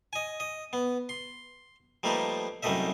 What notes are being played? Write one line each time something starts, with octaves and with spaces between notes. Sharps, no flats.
D#5 G#5
D#5
B3
C6
F3 G3 A3 A#3 D#4 B4
C2 F#2 G3 A3 D#5 E5